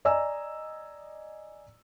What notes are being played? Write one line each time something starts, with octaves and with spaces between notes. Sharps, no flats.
D5 D#5 G#5 A#5 E6